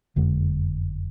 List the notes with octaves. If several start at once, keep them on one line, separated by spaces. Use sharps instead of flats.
F#1 F2 D3 G#3